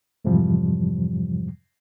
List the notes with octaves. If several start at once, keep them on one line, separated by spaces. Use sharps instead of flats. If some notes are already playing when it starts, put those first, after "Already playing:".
F2 G#2 C3 E3 F3 G3